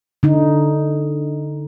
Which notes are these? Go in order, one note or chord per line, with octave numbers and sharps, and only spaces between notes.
D3 D#4